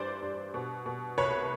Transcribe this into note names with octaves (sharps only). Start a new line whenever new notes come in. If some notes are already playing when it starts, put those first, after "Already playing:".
Already playing: G2 E3 C5 D5
G2
B2
B2
C2 B4 C#5